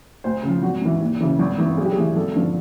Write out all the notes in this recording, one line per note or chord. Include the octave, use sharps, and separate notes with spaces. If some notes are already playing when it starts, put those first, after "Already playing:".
D2 C5
C#3 F3
G#1 F#4
G#2 E3
D#2
C#3 E3
G#1
G2 E3
B1 G#4
G4
G#4
A2 E3
G#1 A4
G2 D3 F3